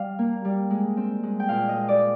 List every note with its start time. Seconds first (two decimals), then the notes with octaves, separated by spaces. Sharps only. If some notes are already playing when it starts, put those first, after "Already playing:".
Already playing: G3 F5
0.19 A#3
0.45 G3
0.70 G#3
0.97 C4
1.23 G#3
1.40 G5
1.49 A#2 F5
1.69 D#5
1.75 G#3
1.88 D5